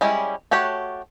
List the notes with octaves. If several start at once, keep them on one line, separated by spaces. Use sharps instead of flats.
G3 G#3 C#4 E4
A3 F#4 G4 C#5 F#5